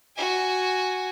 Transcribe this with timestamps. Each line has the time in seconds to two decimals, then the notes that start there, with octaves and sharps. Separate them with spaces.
0.16 F#4 G#5